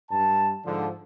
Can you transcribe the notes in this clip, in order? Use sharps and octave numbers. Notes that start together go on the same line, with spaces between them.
G2 A5
G#2 D3 F3